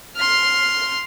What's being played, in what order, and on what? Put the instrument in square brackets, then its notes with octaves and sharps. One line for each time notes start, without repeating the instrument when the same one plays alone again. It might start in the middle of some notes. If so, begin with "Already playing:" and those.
[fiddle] C6 F6